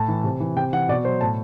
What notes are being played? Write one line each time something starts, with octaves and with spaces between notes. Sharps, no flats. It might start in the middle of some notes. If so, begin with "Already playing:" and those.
Already playing: A2 A5
E3
C3
E3
C3 G5
E3 F#5
B2 D5
F#3 C5
A2 A5